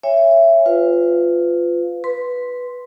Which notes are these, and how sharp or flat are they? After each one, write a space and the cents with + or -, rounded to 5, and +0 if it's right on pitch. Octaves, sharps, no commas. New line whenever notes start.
C#5 +0 E5 +15 G#5 -35
F4 +0 B4 +30 F5 +0
B4 +0 C6 +0